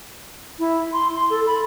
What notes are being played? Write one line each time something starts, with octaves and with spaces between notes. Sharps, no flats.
E4
C6
C6
A4
B5